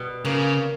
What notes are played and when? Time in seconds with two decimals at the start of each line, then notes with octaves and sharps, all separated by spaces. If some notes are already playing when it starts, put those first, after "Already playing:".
Already playing: B2 G3
0.25 C#3 A#3